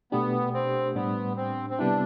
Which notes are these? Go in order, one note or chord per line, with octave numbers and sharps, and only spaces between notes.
B2 A3 B3 D4 G4
C4
A2 G3 B3 D4
C4
C4
C3 G3 B3 D4 E4